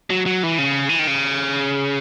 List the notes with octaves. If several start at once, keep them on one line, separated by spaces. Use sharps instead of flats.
F#3
F#3
E3
C#3
E3
D#3
C#3